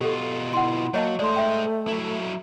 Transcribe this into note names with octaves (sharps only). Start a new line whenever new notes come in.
B2 F4 G4 A4
E4 F#5 C6
F#3 A#3 C#5 D#5 A5
G#3 A3 C5 D5 C6
E5 G5
F#3 E4